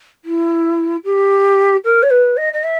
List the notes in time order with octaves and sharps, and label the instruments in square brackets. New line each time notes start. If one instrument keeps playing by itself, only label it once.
[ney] E4
G4
A#4
C#5
B4
D#5
D#5
E5